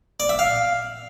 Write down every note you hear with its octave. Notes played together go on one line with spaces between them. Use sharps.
D5
E5
F5